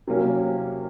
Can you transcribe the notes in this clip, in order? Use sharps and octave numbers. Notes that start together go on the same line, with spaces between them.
C3 F#3 A#3 C#4